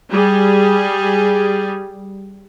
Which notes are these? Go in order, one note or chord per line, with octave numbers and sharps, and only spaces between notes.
G3 G#4